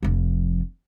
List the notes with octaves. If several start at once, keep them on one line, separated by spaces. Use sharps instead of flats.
F1 F3